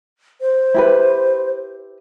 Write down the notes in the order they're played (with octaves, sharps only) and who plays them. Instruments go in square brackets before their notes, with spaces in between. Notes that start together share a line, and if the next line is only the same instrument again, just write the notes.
[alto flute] C5
[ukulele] E4 G4 B4